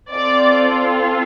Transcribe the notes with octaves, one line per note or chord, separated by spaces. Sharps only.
C4 F4 A4 D5